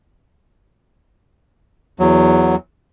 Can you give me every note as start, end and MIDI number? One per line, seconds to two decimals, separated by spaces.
2.00 2.56 40
2.00 2.56 54